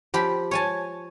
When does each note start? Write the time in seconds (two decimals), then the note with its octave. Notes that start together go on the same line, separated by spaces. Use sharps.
0.14 F3 G4 B5
0.51 C#5 G#5 A5